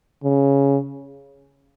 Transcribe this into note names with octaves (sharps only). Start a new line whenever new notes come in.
C#3